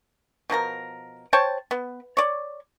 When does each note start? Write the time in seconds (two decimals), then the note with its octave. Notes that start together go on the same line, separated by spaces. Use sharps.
0.50 B2 F3 A#4 A#5
1.33 C5 C#5 G5 A5
1.71 B3
2.17 C#5 D5